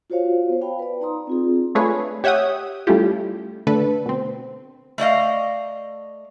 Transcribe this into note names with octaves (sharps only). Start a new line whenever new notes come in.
F4 F#4 C5 C#5 F5
B3 C5
F5 G5 A5 B5
B4 D5
D#4 D5 A#5 C6 D#6
C4 F4 G#4
A3 D4 F4 G#4 B4 C#5
G4 C#5 E5 F#5 G5 D#6
G3 A3 C#4 E4 F4 G4
D3 A3 A4 B4
B2 C4
A3 D5 D#5 F5